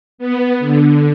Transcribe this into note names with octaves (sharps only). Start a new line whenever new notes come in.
B3
D3